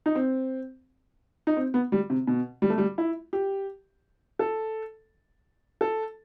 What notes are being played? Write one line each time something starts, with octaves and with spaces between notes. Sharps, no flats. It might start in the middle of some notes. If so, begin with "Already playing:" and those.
D#4
C4
D#4
C4
B3
G3
C3
B2
G3
A3
G3
E4
G4
A4
A4